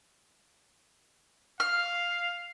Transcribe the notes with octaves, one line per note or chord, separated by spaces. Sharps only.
F5 F6